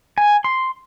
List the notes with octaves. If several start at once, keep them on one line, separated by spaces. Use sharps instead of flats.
G#5
C6